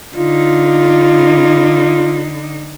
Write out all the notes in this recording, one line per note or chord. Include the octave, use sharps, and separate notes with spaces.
D3 D#4 F4